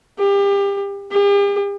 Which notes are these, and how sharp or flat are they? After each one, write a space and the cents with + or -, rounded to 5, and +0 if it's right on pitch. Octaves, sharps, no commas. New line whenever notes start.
G4 +30
G4 +45